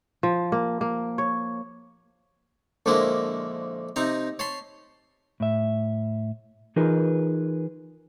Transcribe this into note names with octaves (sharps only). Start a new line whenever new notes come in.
F3
A#3
A#3
C#5
A#1 D3 F3 G#3 A#3 E4
C3 C4 D#4 A#5
C#5 A5 B5 C6
A2 E5
E3 D#4 F4 G#4 A#4 B4